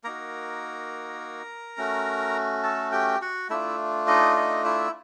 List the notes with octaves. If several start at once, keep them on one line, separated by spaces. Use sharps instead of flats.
A#3 D#4 F#4 A#4 A#5
A3 C#4 F#4
A4 A5
G4 G5
F#4 F#5
A3 D4 E4 F4 E5
D#4 D#5
D#4 D#5
E4 E5